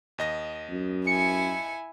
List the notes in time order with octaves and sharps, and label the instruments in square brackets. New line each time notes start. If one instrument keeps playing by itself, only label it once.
[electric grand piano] D#2 D#5 A#6
[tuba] F#2
[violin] E4 G#5 [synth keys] C#7